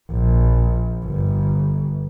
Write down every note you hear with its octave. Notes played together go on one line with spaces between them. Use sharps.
A#1
G1